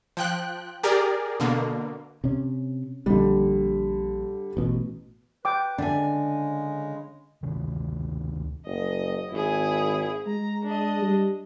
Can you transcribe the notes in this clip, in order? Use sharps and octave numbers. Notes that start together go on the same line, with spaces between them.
F3 G5 F#6
G4 G#4 A#4 D5
B2 D3 A#3
C3 C#4
A#1 D3 G3
A1 B2
B4 G5 D6
D3 D4 E5 G#5
C#3 G#3
D2 C3 D#3
F#1 D#5
G#1 E4 G#4
G#3 A#5
D4 D#5
G3